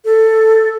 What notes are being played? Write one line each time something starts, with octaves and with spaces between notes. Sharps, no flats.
A4